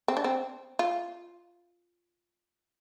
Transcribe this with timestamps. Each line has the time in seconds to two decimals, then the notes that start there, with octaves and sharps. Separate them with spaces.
0.08 C4
0.17 D4
0.24 C4
0.79 F4